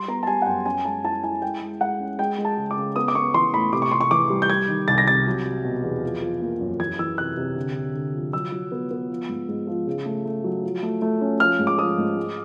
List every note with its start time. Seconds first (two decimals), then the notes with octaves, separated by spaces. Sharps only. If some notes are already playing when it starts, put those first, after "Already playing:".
Already playing: G3 C6
0.08 B3 A#5
0.23 A5
0.27 G3 G#5
0.42 F#5
0.46 F#2 G5
0.66 C#4 G#5
0.85 G#3 A5
1.04 E4 A5
1.23 E4 G#5
1.42 G#3 G5
1.62 G#3
1.81 G#3 F#5
2.00 C#4
2.19 G#3 G5
2.38 G#3
2.45 A5
2.57 C#3
2.71 D6
2.77 C#3
2.96 B3 D#6
3.08 D6
3.15 B3 C#6
3.34 E3 C6
3.53 A2 B5
3.73 C3 D6
3.82 C#6
3.92 C3 C6
4.01 C#6
4.11 E3 D6
4.30 G3
4.42 G6
4.49 G3 G#6
4.68 D#3
4.88 C2 A6
4.98 A#6
5.07 C3 A6
5.27 F#3
5.45 F#3
5.64 B2
5.84 E2
6.03 F3
6.22 F3
6.41 A#3
6.61 F#2
6.80 E3 G#6
6.99 E3 E6
7.18 C3 F#6
7.37 C3
7.56 D3
7.75 D3
7.95 D3
8.14 F3
8.33 F#3 E6
8.52 F#3
8.72 B3
8.91 B3
9.10 F3
9.29 G#2
9.48 G#2
9.67 F3
9.87 C#3
10.06 A3
10.25 A3
10.44 F#3
10.64 F3
10.83 A3
11.02 A3
11.21 C#4
11.40 F3 F6
11.59 G#2
11.67 D6
11.78 F3 D#6
11.98 G#2
12.17 G#3